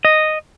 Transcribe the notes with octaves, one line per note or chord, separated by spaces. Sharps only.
D#5